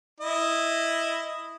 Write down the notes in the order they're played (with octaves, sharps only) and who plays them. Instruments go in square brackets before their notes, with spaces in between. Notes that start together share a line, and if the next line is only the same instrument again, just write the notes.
[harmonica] E4 D#5